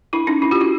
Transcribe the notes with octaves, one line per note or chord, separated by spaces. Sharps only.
D4 E4
C#4 D#4
D4 E4
F4 G4
E4 F#4